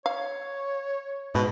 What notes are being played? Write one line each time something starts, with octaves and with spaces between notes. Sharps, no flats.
C#5 F5
G#2 B2